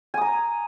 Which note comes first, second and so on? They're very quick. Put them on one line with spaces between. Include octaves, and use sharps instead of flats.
G#5 D#6 A#5